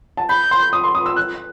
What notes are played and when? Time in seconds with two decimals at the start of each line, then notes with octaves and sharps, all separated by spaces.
0.17 A5
0.29 B5 G6
0.51 C6
0.73 D#6
0.84 C6
0.95 D#6
1.06 E6
1.16 F#6